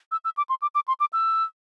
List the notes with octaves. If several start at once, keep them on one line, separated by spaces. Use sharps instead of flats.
E6
E6
D6
C6
D6
D6
C6
D6
E6